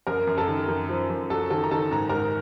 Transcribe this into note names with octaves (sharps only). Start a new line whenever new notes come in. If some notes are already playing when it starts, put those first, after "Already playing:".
F#2 A#4 A#5
F#2
A4 A5
D#3
F#2
F3
F#2
F#3 A4 A5
D#3 A4 A5
A#5
D#3 A4 A5
G#2 A#5
G#2 A#4 A#5